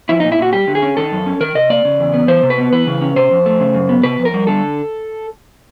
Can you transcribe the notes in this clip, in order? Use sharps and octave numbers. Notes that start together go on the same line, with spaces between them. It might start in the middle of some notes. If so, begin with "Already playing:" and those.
F3 E4
A#2 D#4
E4
A#2 F#4
G3 G4
D3
G#4
C#4
D#3 A4
F#2
C#4
D#3 A#4
C3 D#5
A#3 D5
C#3
E2
B3
E3 C5
C3
B4
B3
E3 B4
C#3
C#4
C3 C5
F2
A3
C#3
F#2
B3
C3 B4
F2
A#4
G3
D3 A4